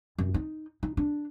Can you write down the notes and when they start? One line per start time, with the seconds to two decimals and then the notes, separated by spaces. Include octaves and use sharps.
0.18 F#2
0.34 D#4
0.83 D#4
0.97 D4